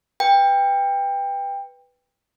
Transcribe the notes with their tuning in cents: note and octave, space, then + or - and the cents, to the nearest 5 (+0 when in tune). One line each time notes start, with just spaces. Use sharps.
B4 +0 G5 +20